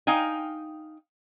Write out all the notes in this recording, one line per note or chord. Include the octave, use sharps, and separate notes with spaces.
D#4 F5 G5 G#5